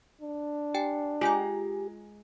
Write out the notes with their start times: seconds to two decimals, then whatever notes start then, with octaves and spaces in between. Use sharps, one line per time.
0.22 D4
0.74 G4 G5 G#5
1.21 G#3 F4 G4 G#5 A#5